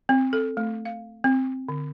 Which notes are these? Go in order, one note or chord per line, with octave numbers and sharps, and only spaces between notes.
C4
A4
A3
F5
C4
D3